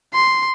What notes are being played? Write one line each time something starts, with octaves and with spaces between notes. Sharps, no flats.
C6